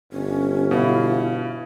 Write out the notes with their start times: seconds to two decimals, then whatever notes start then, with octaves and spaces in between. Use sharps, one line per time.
0.13 G1 C#4
0.71 B2 E4 F5